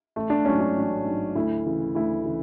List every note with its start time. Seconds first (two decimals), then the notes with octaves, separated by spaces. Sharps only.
0.16 A1 A3
0.30 D4
0.45 G#2 F#3 C#4
0.60 D4
0.76 A1
1.05 G#2
1.10 F#3
1.35 D2 E4
1.65 C#3 E3
1.95 D2 E4
2.26 C#3 E3